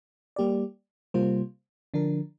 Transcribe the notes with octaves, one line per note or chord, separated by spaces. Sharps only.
G3 A#3 G4 D5
C3 G3 A#3 F4 C5
D3 F3 D4 A#4